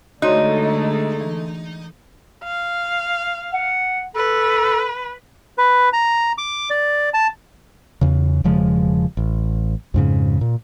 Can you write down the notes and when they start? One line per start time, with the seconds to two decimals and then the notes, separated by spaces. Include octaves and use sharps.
0.22 D3 G#3 A3 D#4 F#4 C#5 C6
1.21 E3
2.44 F5
3.54 F#5
4.16 A4 B4
5.58 B4
5.93 A#5
6.38 D6
6.70 D5
7.14 A5
8.01 E2 C#3
8.44 E1 C#3 F3 G#3
9.17 A1
9.94 F2 G#2 C#3
10.41 A#2